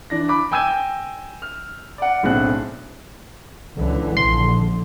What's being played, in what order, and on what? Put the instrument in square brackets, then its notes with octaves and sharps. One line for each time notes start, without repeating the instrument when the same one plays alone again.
[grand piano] E3 D4 A#6
B5 D6
G5 G#5 E6 G6 G#6 D#7
F6
D5 F#5
B1 A2 C4 D4 G#4 F#6
[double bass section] C#2 D3 E3
[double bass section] A#1 D3 [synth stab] C6